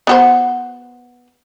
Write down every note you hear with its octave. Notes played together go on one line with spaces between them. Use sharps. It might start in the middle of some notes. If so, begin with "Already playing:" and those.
B3 F#4 C5